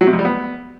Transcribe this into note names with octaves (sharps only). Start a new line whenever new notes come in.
F#3
C3
F2
G3
B3